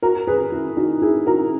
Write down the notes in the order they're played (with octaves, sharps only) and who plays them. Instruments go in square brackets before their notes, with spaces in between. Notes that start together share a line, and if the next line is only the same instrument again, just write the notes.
[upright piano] F#4 A#4
G#4 B4
E4
D#4 F#4
E4 G#4
F#4 A#4